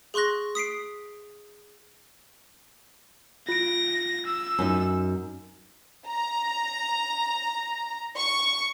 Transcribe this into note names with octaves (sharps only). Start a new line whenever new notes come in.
G#4 C6 C#6 F#6 A#6
D#6 B6 C7 D7
F4 A#6 D7
E6
F#2 D#4
A#5
C#6